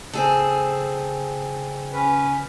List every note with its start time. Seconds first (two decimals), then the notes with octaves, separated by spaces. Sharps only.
0.13 C#3 C4 G#4 A4
1.93 C#4 B4